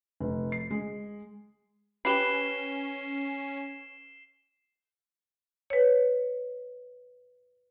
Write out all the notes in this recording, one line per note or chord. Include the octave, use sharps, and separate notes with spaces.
F1
C7
G#3
C#4 G4 B4 C7 E7 G7
B4 C#5